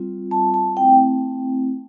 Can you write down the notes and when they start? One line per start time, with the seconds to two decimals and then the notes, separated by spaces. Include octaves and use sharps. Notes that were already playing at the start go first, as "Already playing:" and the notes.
Already playing: G3 C4 F4
0.31 A5
0.54 A5
0.76 A3 C4 E4 G5